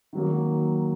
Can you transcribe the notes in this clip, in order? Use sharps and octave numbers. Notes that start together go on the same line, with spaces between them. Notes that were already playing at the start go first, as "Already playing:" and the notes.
D#3 F#3 A#3